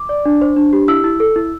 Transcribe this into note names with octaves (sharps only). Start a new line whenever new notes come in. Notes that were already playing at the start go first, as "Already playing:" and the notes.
Already playing: D6
D5
D4
C5
D4
G4
E4 E6
E4
A4
E4